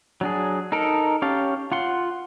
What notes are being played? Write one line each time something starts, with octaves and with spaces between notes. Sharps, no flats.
F#3 D4 G#4
D#4 A4 A#4
C#4 G4 F5 A5
F4 F#5 C6